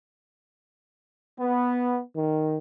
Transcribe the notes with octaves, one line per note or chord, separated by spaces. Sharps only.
B3
D#3